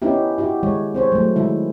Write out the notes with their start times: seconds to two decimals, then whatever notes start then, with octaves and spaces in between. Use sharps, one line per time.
0.02 B3 C#4 D#4 E4 G4
0.38 E4 F#4 G4
0.63 D#3 G#3 C#5
0.94 C4 C5 C#5
1.12 F#3 A3
1.36 D#3 G#3 E4